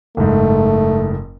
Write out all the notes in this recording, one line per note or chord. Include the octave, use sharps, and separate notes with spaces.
F#1 G#2 A3